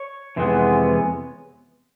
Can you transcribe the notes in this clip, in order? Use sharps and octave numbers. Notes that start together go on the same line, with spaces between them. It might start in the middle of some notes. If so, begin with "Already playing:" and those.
Already playing: C#5
F2 C3 E3 G#3 B3